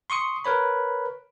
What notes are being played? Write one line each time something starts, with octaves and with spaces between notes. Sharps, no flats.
C6 C#6 D#6 C#7
A#4 B4 C#5 B5